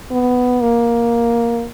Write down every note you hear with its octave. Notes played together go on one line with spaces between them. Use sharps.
B3
A#3